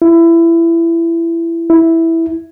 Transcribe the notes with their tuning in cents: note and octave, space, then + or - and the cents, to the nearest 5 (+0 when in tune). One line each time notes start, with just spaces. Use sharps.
E4 +20
E4 -5